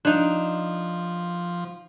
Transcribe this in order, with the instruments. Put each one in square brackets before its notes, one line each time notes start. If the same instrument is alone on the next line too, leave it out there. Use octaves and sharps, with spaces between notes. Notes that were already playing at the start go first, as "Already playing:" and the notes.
[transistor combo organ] F3 [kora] D4 D#4